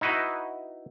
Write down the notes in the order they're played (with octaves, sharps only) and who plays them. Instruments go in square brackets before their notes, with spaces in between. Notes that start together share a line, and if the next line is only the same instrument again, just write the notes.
[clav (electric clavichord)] D#4 E4 F#4 B4 D#5